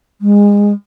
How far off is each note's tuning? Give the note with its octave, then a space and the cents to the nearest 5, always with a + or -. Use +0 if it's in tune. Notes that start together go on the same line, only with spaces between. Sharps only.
G#3 -25